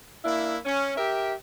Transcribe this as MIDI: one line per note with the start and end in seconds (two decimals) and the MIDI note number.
0.24 0.57 58
0.24 0.57 62
0.24 0.57 64
0.65 0.93 61
0.96 1.33 67
0.96 1.33 70
0.96 1.33 76